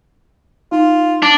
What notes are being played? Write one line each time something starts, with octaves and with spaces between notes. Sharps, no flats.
D#4 F4
D4 D6